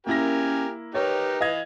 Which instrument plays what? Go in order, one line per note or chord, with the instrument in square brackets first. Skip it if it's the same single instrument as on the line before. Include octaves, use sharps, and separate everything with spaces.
[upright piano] A#3 E4 A#6 [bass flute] C#4 [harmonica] G4 A#4 G#5
[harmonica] D#4 G4 A#4 [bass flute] B4 [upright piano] C#5
[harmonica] E3 [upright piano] D#5 F5 G#6